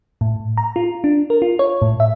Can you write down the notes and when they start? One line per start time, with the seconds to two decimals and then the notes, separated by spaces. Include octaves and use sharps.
0.21 A2
0.57 A#5
0.76 F4
1.04 D4
1.30 A#4
1.42 F4
1.59 C#5
1.82 A2
2.00 E5